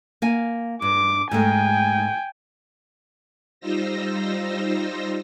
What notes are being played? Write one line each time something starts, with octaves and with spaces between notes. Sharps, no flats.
A#3 F5 G#5
G2 D6
G#2 G#3 A3 G5 G#5
G3 D#4 F4 C5 E6 A#6